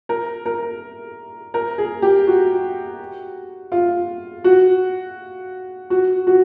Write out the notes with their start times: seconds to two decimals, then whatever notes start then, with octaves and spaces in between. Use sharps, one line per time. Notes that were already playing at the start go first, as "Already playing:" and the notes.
0.09 A#4
0.45 A#4
1.54 A#4
1.78 G#4
2.02 G4
2.27 F#4
3.72 F4
4.44 F#4
5.90 F#4
6.27 F#4